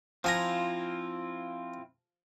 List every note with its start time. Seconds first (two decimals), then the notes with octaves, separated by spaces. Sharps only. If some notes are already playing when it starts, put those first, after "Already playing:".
0.24 F3 C4 E4 F4 G#5 A#5